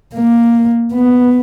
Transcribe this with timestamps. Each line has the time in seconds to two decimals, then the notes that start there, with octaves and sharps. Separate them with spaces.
0.15 A#3
0.93 B3